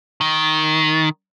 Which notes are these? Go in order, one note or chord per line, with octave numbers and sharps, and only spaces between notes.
D#3